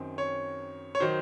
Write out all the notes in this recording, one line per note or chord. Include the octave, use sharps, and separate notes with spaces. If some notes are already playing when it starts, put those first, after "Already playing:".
Already playing: F#2 D#3 C4
C#5
C#5
D#3 F#3 C5